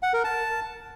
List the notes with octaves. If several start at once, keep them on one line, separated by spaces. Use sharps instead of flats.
F#5
A#4
A5